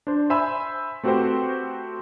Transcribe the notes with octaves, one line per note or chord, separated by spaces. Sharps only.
D4 C5
C5 E5 G#5 B5 E6
A3 C4 F#4 G4 B4 C5